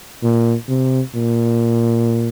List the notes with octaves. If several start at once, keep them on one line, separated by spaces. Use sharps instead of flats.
A#2
C3
A#2